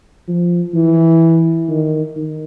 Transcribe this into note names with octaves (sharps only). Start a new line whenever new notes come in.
F3
E3
D#3
D#3